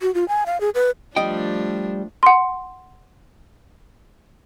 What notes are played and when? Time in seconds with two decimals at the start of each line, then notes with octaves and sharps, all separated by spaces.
0.01 F#4
0.15 F4
0.28 G#5
0.46 F5
0.60 G#4
0.75 B4
1.16 F3 G3 A3 D4 D#5 G5
2.23 F#5 C6